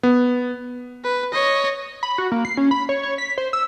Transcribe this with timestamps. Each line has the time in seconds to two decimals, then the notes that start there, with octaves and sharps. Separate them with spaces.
0.03 B3
1.04 B4
1.32 C#5 D#5
2.03 B5
2.18 F#4
2.32 A#3
2.45 C7
2.57 C#4
2.71 B5
2.89 C#5
3.03 C#5
3.18 B6
3.38 C5
3.53 E6